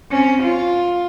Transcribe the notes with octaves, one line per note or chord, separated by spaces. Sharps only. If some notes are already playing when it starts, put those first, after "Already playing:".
C4 C#4
F4